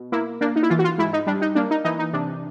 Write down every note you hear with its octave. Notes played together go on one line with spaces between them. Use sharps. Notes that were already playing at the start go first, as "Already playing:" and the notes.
Already playing: B2
A#3 E4
A#3 D4
D#4
E4
E3 F4
F#4
F4
G#2 E4
D#4
G3 D4
D#4
A#3 D4
D#4
E3 D#4
D#4
C3 D4